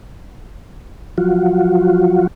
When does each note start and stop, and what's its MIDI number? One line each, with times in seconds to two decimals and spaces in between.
1.18 2.27 53
1.18 2.27 54
1.18 2.27 65
1.18 2.27 66